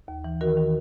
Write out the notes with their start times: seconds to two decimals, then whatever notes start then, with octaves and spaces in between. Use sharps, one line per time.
0.08 D#2
0.24 E3
0.41 D#3 F#4 A#4
0.57 D#3